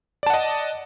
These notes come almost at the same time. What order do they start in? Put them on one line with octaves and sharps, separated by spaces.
D5 A5 F#5 D#5